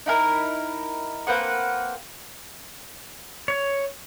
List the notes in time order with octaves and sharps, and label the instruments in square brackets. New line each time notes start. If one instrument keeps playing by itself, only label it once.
[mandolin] D#4 E4 A#4
A#3 C4 B4 F#5
[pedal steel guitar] C#5